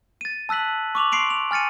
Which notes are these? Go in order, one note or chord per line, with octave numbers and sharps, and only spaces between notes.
A6 D#7
A5 E6 F#6 B6 F#7
C#6 D6 F7 F#7
C6 C7 D7 F7 F#7
F7
G#5 F6 A6 C#7 D#7